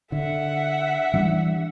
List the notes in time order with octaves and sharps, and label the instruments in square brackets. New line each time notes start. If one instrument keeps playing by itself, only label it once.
[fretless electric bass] D3 [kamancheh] E5 F#5
[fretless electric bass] E3 G3 D4